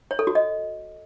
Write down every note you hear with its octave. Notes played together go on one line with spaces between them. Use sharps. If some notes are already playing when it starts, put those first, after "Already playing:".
C#5
A4
F#4
D#5